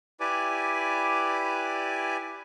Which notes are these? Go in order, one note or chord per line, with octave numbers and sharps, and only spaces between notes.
E4 G4 B4 D5 G#5 D6